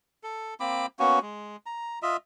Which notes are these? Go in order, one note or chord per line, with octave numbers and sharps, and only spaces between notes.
A4
A#3 C4 B5 D6
A#3 B3 C#4 F#4
G#3
A#5
F4 D#5 E5